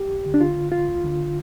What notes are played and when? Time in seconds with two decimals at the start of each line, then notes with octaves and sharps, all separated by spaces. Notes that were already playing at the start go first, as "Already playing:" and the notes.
Already playing: F2 G4
0.10 D2
0.26 D3
0.34 D4
0.41 D3 F4
0.56 D3
0.72 D2 F4
0.88 D2
1.04 D3